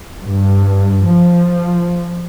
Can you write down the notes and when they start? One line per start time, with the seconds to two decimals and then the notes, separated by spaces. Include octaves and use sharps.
0.23 G2
1.09 F3